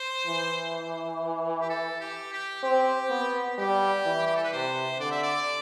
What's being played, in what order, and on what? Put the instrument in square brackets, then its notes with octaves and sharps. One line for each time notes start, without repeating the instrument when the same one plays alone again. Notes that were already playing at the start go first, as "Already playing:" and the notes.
Already playing: [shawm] C5
[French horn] E3
[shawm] G4
A4
G4
G4
[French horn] C4 [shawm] G4
[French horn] B3
[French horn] G3 [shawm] G4
[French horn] E3
[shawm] G4
A4
B4
[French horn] C3 [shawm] C5
[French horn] D3 [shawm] D5
[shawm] E5
D5